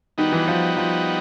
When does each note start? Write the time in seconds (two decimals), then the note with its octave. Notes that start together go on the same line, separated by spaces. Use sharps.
0.18 D#3 G3 B3 D#4 F#4
0.33 E3
0.48 F3
0.77 F3